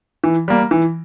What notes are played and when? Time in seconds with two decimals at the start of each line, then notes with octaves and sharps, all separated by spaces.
0.24 E3
0.48 G3 A#3
0.71 E3